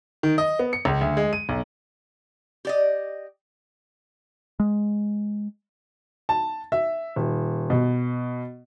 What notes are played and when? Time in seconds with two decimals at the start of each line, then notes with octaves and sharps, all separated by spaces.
0.23 D#3
0.38 D#5
0.59 B3
0.73 C#7
0.85 C#2
1.01 D2
1.17 G#3
1.33 D#7
1.49 B1
2.65 G4 D5 D#5
4.60 G#3
6.29 A5
6.72 E5
7.16 D#1
7.70 B2